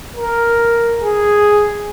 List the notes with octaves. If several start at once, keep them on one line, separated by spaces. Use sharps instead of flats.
A#4
G#4